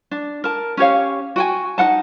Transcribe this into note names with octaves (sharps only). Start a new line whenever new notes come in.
D4
A#4 A5
C#4 G4 C#5 F5
F#4 G5 G#5
D#4 A#4 F#5 A5